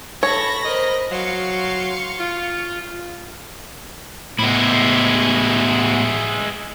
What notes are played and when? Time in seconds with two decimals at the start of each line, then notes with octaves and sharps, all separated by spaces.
0.23 A4 C#5 B5 C#6 A#6
0.65 A#4 C5 D#5
1.11 F#3 F5 C6 C#6
2.20 F4
4.39 A2 G#3 B3 E4